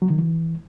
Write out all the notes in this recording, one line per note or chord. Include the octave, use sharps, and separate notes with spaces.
F#3
D#3
E3